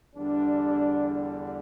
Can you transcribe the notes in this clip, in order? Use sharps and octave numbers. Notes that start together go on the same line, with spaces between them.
E2 D3 G3 D4